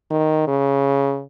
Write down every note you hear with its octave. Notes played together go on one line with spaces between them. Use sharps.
D#3
C#3